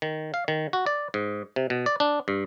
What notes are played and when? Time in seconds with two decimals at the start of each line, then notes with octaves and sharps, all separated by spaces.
0.02 D#3
0.34 F5
0.48 D#3
0.73 F#4
0.86 D5
1.14 G#2
1.56 C3
1.70 B2
1.86 D5
2.00 D4
2.28 G2